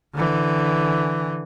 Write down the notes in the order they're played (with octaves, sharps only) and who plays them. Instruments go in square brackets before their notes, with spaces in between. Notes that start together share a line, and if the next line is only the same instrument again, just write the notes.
[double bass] D3 E3